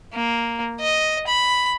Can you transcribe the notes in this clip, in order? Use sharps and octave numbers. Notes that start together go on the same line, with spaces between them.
A#3
D#5
B5